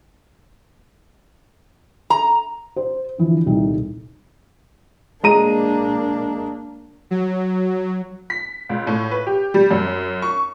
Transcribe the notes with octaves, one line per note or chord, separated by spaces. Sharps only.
A#5
C5
D3 E3 F3
D#1 C2 D#4
G#3 A#3 D4 A#5 D#7
F#3
B6
C#2
A2
B4
G4
G3
F#2
C#6